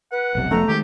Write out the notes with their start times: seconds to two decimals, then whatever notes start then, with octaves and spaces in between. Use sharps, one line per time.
0.12 B4 F#5
0.35 F1 B1 C3
0.51 F1 F3 A3 B3 A#5
0.68 D#3 G#3 G4